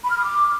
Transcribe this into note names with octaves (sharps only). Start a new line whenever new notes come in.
B5
F6
D#6
D6